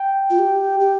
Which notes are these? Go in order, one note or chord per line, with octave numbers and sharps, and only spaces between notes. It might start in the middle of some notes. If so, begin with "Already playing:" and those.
Already playing: G5
F4
G4
G4